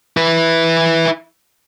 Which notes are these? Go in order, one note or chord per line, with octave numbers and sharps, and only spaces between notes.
E4 B4